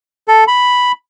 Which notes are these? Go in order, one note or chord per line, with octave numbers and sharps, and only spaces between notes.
A4
B5